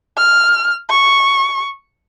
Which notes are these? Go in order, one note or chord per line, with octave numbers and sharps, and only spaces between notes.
F6
C#6